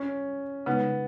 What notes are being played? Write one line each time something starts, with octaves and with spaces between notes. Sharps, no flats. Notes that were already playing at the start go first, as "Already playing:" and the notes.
Already playing: C#4
C#3 G#3 B3 D#4